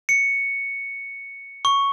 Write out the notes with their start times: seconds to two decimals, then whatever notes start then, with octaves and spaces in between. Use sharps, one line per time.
0.09 C#7
1.65 C#6